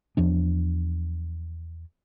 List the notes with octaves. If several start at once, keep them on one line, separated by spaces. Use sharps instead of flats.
E2 F3 D4